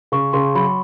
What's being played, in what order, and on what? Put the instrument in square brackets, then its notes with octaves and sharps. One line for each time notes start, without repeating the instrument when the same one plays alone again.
[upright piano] C#3 [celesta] C#6
[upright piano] C#3 [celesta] C6
[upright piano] F#3 [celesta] B5